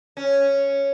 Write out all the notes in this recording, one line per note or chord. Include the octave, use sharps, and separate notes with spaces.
C#4